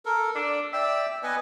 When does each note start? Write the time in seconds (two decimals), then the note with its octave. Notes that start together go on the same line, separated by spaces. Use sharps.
0.05 A4 A#4
0.35 D4 A4 D5
0.73 D5 E5 G5
1.23 B3 B4 D#5 G#5